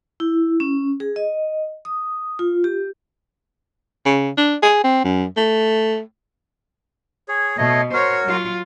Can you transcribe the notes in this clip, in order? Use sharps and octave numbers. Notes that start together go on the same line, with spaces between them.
E4
C#4
G#4
D#5
D#6
F4
G4
C#3
D4
G#4
C4
F#2
A3
G#4 C#5
B2 A3 C#5 D#5
F#4 A#4 C5 C#5
F#3 F4